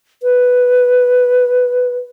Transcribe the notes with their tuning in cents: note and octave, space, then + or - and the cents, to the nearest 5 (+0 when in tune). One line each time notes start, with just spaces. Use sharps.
B4 +5